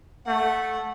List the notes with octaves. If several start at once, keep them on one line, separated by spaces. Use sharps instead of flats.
A3 F#5